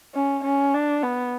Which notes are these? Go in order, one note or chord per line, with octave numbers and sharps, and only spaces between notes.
C#4
C#4
D4
B3